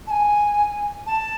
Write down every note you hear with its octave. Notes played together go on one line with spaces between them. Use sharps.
A5
G#5
A5